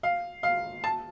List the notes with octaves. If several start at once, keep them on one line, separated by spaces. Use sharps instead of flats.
F5
F5
A5